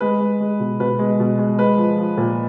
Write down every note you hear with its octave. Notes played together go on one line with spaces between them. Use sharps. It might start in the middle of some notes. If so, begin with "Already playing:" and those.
G#3 B4
G#3
G#3
B2
B2 B4
G#3
B2
G#3
G#3 B4
F3
F3
A#2